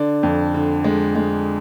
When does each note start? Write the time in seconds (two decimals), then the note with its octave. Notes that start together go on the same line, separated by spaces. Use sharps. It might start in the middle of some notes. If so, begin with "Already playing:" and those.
Already playing: D3 D5
0.23 F2
0.54 D3
0.84 G#3
1.15 G#3